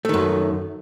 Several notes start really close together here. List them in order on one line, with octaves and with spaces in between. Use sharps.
A3 D#3 F#2